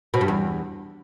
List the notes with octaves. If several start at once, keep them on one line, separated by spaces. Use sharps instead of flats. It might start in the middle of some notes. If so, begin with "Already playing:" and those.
B2
G2
E2